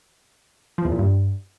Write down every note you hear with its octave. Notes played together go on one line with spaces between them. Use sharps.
F3
E2
A#2
G2